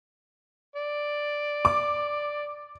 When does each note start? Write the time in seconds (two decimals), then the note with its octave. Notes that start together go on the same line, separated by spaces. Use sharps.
0.76 D5
1.65 D6